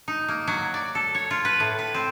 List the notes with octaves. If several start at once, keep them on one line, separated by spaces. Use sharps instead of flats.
D#4
A#3
F#3
D5
A4
C#5
F4
B4
A2
B4
C4